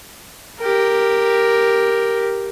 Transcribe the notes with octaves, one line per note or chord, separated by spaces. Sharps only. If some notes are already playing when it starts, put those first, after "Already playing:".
G4 A#4